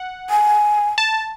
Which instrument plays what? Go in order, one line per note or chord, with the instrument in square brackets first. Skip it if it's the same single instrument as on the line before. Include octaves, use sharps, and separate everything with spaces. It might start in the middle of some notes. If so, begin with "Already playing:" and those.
Already playing: [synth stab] F#5
[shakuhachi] G#5
[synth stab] A5